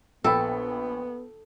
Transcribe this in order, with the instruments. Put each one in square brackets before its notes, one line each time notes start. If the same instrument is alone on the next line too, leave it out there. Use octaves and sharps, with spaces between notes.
[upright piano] A#1 G5 B5 [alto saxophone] B3 [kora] A4 [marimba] E6